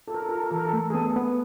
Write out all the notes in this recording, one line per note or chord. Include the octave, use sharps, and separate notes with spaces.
F4 A4
A#4
A4
F4 A#4
A4
A#4
E3 A4
A#4
A4
A3
G#4
B3 A4
B3